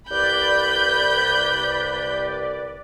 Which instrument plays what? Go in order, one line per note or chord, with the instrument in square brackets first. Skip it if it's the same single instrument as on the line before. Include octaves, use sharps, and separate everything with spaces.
[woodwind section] C2 B4 [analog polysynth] D5 [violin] B5 G6